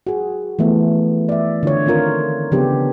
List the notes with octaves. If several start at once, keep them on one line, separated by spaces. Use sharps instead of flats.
F#4 G#4
E3 F3 A3 B3
D5 E5
D3 F4 C#5
D#3 C4 F4 A#4
C#3 F3 B3 D4 G4